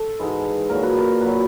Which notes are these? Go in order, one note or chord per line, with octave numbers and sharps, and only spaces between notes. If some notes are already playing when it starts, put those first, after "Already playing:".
Already playing: A4
G#2 E3 G#3
A#2 F#3 A#4
B4
A#4
A#2 F#3 B4